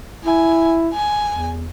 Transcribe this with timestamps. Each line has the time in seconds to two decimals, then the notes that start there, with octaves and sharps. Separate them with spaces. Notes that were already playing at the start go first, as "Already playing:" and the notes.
0.25 E4 G#5
0.94 G#5
1.29 E2